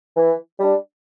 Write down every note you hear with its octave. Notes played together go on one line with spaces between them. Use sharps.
E3
G3 D4